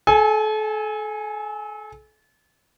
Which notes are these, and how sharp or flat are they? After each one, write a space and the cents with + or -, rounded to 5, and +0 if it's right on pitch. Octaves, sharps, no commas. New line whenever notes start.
A4 -35 G#5 +0